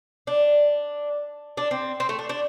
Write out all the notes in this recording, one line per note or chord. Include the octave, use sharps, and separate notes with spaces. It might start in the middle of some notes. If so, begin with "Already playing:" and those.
D4
D4
C4
C4
A3
D4
D4